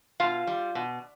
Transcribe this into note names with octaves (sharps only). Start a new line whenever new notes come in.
B2 F4 F5
G3
B2